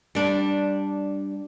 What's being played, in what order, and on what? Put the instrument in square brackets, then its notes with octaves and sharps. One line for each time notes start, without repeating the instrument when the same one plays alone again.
[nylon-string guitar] G3 D4